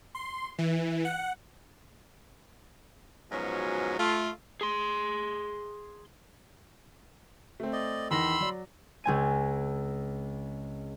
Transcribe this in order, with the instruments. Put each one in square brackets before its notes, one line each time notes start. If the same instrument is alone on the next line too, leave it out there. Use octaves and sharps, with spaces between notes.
[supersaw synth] C6
E3
F#5
[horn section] G#2 B2 F3 F#3 C#4
A3 F4
[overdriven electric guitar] G#4 C6
[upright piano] A3 C4
[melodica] D5 D#5
[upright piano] E2 D#3 A#6 [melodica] B5 C6 E6
[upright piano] F#3 D5
[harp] C#2 C4 G#5 D#7